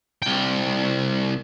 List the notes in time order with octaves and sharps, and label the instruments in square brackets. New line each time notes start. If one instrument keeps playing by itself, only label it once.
[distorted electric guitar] C2 G5